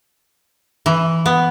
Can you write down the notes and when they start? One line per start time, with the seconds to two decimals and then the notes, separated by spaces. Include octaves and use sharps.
0.86 E3
1.26 B3